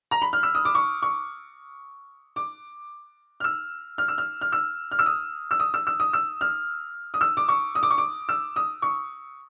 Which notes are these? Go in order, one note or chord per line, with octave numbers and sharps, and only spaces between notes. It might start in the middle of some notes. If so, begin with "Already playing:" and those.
A#5
B5
F6
E6
D#6
D6
C#6
C#6
D6
F6
E6
F6
E6
F6
F6
E6
F6
E6
D#6
E6
D#6
E6
E6
D#6
E6
F6
D#6
E6
D6
C#6
D#6
D6
C#6
D6
E6
D#6
C#6